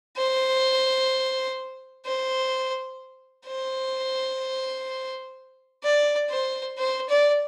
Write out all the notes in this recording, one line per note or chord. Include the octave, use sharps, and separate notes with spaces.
C5
C5
C5
D5
C5
C5
D5